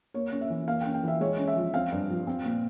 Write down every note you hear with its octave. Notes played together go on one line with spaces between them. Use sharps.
A#3 C#5
C#4
E5
E3
A#3 F5
G5
C#4
G5
E3 E5
G#3 C#5
C#4
E5
F3
C4 F5
G2
F3
C4
A#2